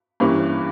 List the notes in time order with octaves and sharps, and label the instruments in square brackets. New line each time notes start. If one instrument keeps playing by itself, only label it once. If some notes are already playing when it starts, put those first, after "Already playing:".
[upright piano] G2 E3 A#3 C#4